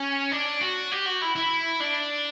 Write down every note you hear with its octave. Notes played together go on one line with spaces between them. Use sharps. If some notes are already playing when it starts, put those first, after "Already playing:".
Already playing: C#4
D4
F#4
G4
F#4
E4
E4
D4